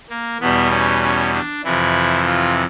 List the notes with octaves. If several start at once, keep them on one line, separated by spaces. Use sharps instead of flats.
A#3
E2 B2 G3 B3
C#4
C#4
D4
F2 C3 E3 E4
F4